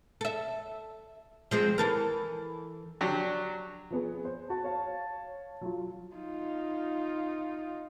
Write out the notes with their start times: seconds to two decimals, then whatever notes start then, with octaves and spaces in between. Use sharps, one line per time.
0.21 A4 E5
1.51 F3 G#3 C4
1.78 E3 A4 A#4
3.01 F#3 D4 G4
3.90 F3 B3 G#4
4.25 C5
4.50 F#4 A5
4.64 C#5 F5
5.61 F#3 F4
6.15 D#4 F4